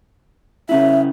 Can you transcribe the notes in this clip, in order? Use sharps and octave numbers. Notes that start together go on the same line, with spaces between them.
C#3 C#4 E4 E5